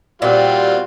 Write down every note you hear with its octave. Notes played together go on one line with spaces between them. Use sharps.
A#2 G3 C4 F4 F#4